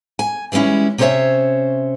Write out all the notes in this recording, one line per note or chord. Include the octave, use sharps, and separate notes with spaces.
G#5
E3 G3 G#3 C#4 E4
C3 C#4 A4 C5 C#5 E5